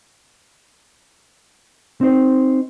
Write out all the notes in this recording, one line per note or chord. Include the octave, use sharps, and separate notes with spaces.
C4 D#4 C5